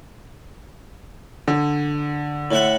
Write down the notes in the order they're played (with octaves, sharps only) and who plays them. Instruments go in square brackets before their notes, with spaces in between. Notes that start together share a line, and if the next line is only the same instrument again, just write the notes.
[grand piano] D3
[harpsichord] A2 E5 F#5